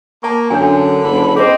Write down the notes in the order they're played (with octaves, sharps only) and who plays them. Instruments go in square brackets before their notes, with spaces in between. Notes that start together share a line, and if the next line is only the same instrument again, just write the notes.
[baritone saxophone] A#3 [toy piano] A5 C#6
[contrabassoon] F#2 [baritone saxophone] D3 [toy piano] D4 G#5
[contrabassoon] F#1 [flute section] B5
[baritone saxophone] C4 [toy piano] G#4 B4 [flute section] C5 D#5 G5